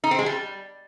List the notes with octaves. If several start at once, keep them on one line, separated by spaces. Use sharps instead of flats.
D#4
C4
G#3
G3